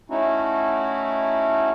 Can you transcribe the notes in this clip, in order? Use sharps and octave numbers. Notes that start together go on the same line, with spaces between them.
A3 C#4 D#4 E4 F#4